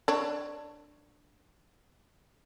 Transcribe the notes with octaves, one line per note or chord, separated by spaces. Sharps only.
D4 C#5